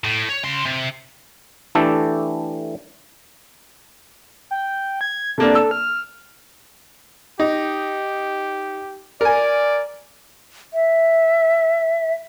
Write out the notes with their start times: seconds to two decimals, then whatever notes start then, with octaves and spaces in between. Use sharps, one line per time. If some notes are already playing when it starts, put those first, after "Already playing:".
0.04 A2
0.29 C#5
0.44 C#3 C6
0.65 C3
1.75 E3 A3 D4 G4 A4
4.51 G5
5.01 G#6
5.38 C3 A#3 D4 A4
5.55 E6
5.71 F6
7.40 D#4 G4
9.21 A#4 D5 G#5
10.74 E5